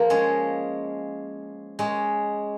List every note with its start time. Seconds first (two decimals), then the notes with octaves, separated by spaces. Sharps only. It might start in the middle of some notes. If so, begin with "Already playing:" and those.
Already playing: F3 A#3
0.10 G#3 C#4
1.79 G#3 C#4